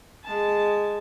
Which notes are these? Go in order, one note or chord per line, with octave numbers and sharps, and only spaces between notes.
G#3 A5